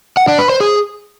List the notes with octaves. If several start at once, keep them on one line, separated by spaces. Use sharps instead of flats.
F#5
D4
B4
C5
G#4